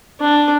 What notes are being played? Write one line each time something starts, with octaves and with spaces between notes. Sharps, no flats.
D4